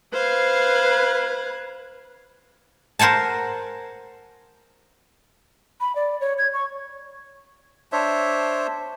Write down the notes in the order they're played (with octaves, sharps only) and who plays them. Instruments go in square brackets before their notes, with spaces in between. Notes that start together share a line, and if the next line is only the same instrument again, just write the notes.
[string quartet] B4 F#6 G#6 [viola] C5 F5
[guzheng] A#4 C5 F#5 G#5 A5
[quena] B5
D5
C#5
G#6
C#6
[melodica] D4 C5 C#5 E5